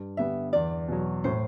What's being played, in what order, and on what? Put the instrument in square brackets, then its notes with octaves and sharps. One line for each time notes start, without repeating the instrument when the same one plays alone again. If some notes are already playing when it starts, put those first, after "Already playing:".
Already playing: [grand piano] G2
[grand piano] D3 G3 B3 [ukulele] E5
[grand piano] E2 [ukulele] D5
[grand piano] B2 F#3
[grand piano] A2 [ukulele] C5